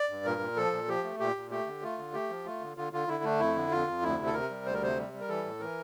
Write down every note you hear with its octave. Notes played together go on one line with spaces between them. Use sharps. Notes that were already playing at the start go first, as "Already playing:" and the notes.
Already playing: D5
G2
A#2 A#4
A#2
F3 A4
A#2
F3 G4
A3
A#2 G4
A#2
A3 G4
D3
A3 F4
D3
A3 G4
F3
A3 F4
D3
D3 F4
D3 F4
D3 E4
A3 D4
F2 E4
D3
F2 F4
F2
D2 E4
C3
A4
C3 A#4
G3
D2 C5
A#4
C3 C5
G3
G3
A#4
E3 A4
A2
E3 A#4